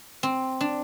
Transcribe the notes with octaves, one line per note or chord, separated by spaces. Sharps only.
C4
D4